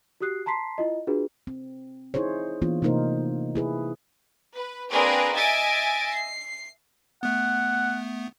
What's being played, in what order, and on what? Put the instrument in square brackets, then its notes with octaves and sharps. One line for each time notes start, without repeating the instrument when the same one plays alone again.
[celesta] F#4 G4 D#6 F#6 C7
A5 A#5 C6 B6 C7
E4 F4 D#5
D4 F4 F#4 G#4 B4
[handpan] C4
D#4 E4 G#4 C5 C#5
E3 A#3 B3 D4 F4
C3 A3 A#3 D#4 A#4 C5
E4 G#4 B4
[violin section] B4
A#3 C4 D4 G#4 A#4 B4
D#5 E5 G#5 A6 D7
C7
[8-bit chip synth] A3 B3 [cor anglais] F#5